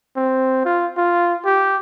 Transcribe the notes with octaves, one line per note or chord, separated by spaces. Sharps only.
C4
F4
F4
G4